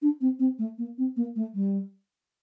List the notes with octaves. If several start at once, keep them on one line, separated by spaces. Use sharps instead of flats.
D4
C4
C4
A3
A#3
C4
A#3
A3
G3